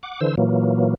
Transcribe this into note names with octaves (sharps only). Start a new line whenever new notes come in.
F#5 D6
D3 E3 C5 E6
A#2 E3 F#3 A#3